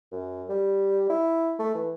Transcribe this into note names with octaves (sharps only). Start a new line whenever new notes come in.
F#2
G3
E4
A3
E3